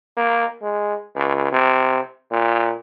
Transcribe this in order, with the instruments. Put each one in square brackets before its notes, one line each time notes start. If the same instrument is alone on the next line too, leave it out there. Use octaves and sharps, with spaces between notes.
[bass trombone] A#3
G#3
C#2
C3
A#2